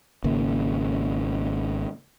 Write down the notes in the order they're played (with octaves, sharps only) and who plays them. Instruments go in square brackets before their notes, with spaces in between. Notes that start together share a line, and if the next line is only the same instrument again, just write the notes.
[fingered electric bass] G#1 C#3 A#3